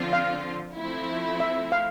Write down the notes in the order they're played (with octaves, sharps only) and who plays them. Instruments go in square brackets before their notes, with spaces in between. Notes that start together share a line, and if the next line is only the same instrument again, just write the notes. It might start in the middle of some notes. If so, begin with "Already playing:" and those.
Already playing: [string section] D3 F3 C4 F4
[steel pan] F5
[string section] F3 A3 C4 E4
[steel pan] E5
F5